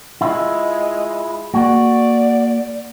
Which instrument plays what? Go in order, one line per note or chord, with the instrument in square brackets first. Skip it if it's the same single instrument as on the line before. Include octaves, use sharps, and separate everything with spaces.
[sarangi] G#3 [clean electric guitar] E4 F4
[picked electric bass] A#3 [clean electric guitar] F#4 [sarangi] D5